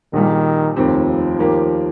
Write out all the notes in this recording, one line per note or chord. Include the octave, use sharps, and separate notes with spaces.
A#1 A#2 D#3 G3
F1 D#2 D#3 F3 C4 G4
D#2 D#3 A#3 G4